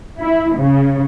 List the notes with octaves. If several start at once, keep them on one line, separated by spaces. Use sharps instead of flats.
E4
C#3